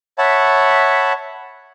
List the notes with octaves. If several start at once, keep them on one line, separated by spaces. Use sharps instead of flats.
C#5 E5 F#5 A5 B5